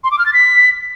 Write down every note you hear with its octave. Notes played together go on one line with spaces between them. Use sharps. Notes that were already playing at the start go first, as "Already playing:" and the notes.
C6
D6
F6
A6
B6